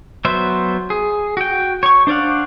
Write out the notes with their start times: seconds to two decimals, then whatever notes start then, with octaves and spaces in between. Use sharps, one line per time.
0.25 F#3 B3 C5 E5
0.90 G#4
1.37 F#4 G5
1.83 C#5 C#6
2.07 D4 C5 D5 F5 F#5